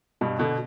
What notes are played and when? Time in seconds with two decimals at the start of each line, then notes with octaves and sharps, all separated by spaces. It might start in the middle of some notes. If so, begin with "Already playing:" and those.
0.21 G2 B2
0.39 B2 D3